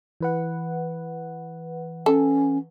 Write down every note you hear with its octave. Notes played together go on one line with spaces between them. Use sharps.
E3 B4 F#5
C#4 A4